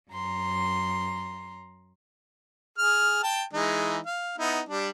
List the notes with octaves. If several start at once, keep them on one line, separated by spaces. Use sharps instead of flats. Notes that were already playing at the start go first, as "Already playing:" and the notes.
F#2 A#5 C6
G#4 F6
G5 A5
E3 G#3 D#4
F5
B3 D#4 E4
G3 D4